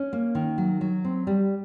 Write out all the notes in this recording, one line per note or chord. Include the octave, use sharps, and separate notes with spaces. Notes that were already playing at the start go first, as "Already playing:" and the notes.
Already playing: C#4
A#3
D#3
F#3
F#3
C4
G3